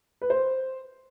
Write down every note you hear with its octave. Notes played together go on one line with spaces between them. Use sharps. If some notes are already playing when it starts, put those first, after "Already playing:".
B4
C5